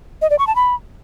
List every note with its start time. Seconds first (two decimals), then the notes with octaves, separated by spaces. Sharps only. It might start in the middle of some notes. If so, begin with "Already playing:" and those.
0.22 D#5
0.30 D5
0.39 C#6
0.47 A5
0.56 B5